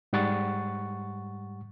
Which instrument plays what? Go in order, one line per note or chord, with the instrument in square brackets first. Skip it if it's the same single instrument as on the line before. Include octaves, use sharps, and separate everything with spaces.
[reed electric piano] G#2 G3 F#5 C#6 A6